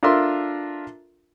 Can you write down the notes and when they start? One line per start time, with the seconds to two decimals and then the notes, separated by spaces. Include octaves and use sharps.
0.03 D4 F4 A4 A#4 E5 C6